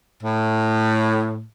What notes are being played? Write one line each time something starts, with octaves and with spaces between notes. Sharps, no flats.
A2